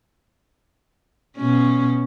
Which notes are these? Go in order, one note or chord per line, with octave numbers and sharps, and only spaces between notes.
B2 C#4